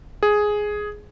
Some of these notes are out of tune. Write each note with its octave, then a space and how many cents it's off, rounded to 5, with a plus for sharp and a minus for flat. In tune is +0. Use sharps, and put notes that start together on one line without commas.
G#4 +5